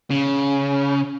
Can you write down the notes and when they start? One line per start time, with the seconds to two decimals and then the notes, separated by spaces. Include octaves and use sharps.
0.10 C#3